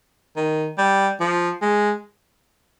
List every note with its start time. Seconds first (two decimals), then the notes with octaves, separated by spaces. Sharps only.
0.36 D#3
0.78 G3
1.20 F3
1.62 G#3